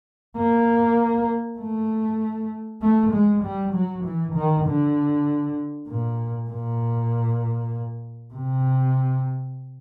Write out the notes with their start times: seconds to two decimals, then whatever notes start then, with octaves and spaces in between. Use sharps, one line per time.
0.37 A#3
1.59 A3
2.82 A3
3.13 G#3
3.43 G3
3.73 F#3
4.04 E3
4.35 D#3
4.66 D3
5.88 A#2
6.50 A#2
8.34 C3